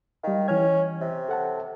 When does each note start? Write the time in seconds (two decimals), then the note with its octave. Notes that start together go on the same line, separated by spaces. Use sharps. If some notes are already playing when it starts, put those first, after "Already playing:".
0.23 D#3 G3 F5
0.48 E3 C#4 F6 G#6
1.01 C3
1.29 A4 F#5 A5